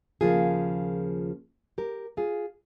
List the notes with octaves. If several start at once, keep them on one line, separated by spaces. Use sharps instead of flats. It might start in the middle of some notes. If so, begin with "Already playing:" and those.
D#2 C#3 F3 A#3 F4 G#4
G4 A#4
F4 G#4